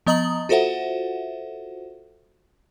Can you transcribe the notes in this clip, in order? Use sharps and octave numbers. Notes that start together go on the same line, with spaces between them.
F3 B3 D#5 A#5 D#6 F#7
F4 F#4 A4 C5 E5 F#5